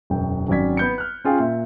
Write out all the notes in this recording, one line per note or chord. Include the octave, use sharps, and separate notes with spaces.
E1 F#2 G5
G#1 F#3 C#4 D5 G#6 B6
B3 G6 C#7
F6 F#6
C#4 F4 G#4 G5
A#2 E5